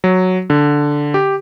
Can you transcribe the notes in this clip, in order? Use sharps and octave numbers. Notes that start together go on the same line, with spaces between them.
F#3
D3
G4